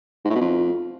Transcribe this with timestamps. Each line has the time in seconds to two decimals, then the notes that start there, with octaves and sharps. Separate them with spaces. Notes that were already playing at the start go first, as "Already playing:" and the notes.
0.25 G#2
0.30 A2
0.35 B2
0.41 F2